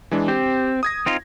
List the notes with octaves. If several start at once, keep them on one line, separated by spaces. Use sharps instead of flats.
E3 G#3 D4
C4 G4
D#6 G#6 A#6
C4 D#4 F4